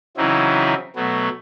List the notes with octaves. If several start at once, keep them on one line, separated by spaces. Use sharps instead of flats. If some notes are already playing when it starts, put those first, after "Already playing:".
C#3 E3 F#3 C4 D#4 E4
B2 F#3 A3 B3